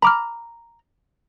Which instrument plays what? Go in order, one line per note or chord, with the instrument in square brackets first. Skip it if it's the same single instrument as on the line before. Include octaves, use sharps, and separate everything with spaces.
[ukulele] A#5 [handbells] B5 D6 F6